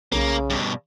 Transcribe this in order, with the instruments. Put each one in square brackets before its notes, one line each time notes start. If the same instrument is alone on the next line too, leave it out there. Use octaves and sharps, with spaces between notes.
[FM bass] B1 [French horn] C#3 [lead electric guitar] A#3
[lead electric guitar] G2 B2